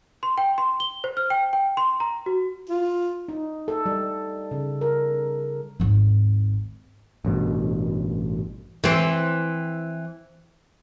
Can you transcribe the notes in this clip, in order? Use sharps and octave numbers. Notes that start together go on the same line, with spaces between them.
C6
G5
C6
G7
C5
F6
G5
G5
C6
A#5
F#4
F4
D#4
A4
G3
C#3
A#4
G#1 D#2
A1 G2 B2
E3 C4